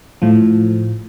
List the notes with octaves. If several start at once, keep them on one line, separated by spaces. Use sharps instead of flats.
A2 F3